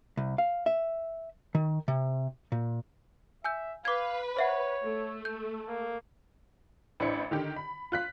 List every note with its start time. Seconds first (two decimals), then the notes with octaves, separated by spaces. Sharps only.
0.17 C2
0.38 F5
0.66 E5
1.55 D#3
1.88 C3
2.52 A#2
3.44 E5 G#5 E6 G6
3.85 B4 F5 D6 G#6
4.37 C5 C#5 E5 F#5
4.84 A3
5.25 G6
5.68 A#3
7.00 A1 D4 E4 C5 C#7
7.31 D3 D#3 G4
7.56 B5
7.92 F4 F#6 B6